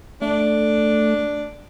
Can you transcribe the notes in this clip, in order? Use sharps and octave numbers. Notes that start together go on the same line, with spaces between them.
A3 D4